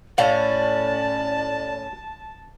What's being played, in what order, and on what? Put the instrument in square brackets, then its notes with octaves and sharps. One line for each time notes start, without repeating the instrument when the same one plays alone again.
[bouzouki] A2 C#4 [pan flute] D5 [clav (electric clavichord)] F5 [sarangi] A5